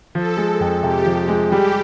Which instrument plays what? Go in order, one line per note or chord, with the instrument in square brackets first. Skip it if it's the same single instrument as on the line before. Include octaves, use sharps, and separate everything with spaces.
[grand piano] F3 [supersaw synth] A4
[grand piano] G#3
F2
[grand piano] C3 [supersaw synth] G4
[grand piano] F3
G#3
[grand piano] G3 [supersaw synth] G4